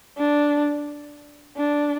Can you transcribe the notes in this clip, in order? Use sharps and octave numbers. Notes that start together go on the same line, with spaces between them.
D4
D4